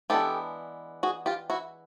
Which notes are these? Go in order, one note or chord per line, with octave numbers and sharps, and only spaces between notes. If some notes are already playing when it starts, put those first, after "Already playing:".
E3 G#3 B3 D4 G4 A4
F#4 G#4
F4 G4
E4 F#4